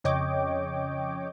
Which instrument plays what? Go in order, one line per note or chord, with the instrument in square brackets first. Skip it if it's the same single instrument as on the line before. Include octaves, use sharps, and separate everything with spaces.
[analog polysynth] F2 C#3 C#5 D#5 G5 D6